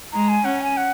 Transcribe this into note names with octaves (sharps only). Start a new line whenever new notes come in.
G#3 A#5
G#5
C#4 F#5
G#5
F#5